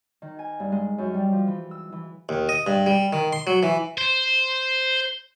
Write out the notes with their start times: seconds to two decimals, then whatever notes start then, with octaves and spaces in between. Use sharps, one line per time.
0.22 D#3
0.39 G#5
0.60 G2
0.72 G#3
0.98 F#2
1.14 G3
1.32 F3
1.47 E3
1.71 E6
1.92 E3
2.29 D#2
2.49 D#5
2.67 G2
2.87 G3
3.13 D#3
3.33 C6
3.47 F#3
3.63 E3
3.98 C5